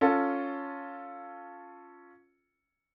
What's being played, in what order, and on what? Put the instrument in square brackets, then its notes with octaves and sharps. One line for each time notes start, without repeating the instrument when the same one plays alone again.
[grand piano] C#4 F4 A4